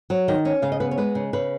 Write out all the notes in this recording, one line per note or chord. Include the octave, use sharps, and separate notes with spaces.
F#3
D#3 D#5
C#4
C#3 F5
D#5
B3 B4
C#5
G#3 B4
C#3
C#3 B4